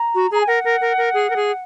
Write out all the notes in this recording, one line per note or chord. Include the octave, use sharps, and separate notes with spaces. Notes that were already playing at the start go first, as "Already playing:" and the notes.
Already playing: A#5
F#4
G#4 A#5
G#5
A#4 F#5
A#4
A#4
A#4
G#4
A#4
G#4